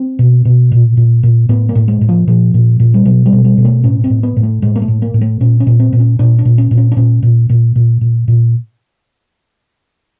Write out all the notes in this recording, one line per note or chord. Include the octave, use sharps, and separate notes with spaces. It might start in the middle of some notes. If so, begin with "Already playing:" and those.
Already playing: C4
B2
B2
A#2
A#2
A#2
A2 B3
A#3
A2
G#3
A2
F3
A#2 F3
A#2
A#2
G3
B2 F#3
G3
B2
G3
B2
A3
A2 C#4
C4
A2
B3
A2
A3
A2 G#3
A#3
A3
A2
A#3
A2
A3
A#2 C#4
C#4
A#2
C4
A#2
C#4
A#2 D4
D4
A#2
C#4
A#2
C#4
D4
A#2 C#4
A#2
A#2
A#2
A#2
A#2